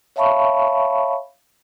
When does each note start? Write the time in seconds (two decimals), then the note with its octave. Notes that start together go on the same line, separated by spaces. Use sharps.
0.16 C#5 E5 F5 A5 B5 C#6